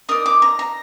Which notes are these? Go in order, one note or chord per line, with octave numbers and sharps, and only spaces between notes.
D#4 A#4 D5 D#6
D6
A#5
A#5